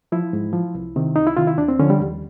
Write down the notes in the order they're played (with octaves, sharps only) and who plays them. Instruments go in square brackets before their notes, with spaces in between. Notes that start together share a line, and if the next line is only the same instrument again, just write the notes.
[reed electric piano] F3 E4
G#2
F3
C2
C3 D#3
C2 D#4
E4
C3 D#3 F4
E4
D#2 D4
C4
D3 F3 C#4
G3
D#2